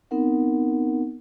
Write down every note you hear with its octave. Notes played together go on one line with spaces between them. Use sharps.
B3 C4 D#4 A#4 F#5